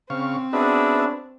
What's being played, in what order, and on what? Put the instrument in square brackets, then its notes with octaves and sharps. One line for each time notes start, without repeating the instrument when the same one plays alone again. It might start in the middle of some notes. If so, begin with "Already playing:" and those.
[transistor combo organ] C#3 F5 C#6 [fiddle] C4
[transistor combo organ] B3 B4 E5 [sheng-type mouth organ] C#4 F#4 G#4 [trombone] D4